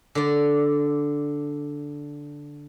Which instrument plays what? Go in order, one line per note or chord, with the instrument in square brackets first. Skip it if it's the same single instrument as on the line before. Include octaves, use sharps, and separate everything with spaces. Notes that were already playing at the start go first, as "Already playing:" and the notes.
[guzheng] D3 D5